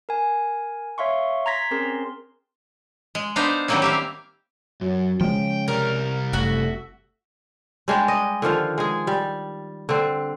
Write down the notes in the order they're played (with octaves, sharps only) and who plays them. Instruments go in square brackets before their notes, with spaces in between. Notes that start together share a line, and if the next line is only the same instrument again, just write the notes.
[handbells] A#4 G#5
C#5 E5 F5 C6 C#6
A#5 C6 G#6 A#6 B6
C4 C#4 G#4 A#4 C6
[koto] G#3
B3 D4 D#4 B4 C5 F5
D#3 F#3 G3 A#3 C4 C#4
G4 E5 F5
[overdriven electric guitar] F#2 [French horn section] F#3
[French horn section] C#3 [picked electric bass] F3 G#3 [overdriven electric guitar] G5
[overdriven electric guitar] C2 G3 [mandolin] A#4
[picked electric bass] F#1 [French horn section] A3 [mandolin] F#4 E5
[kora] G3 G#3 D4 G4
D#5
D3 D#3 F3 F4
G#3 G#4
G3
D3 C4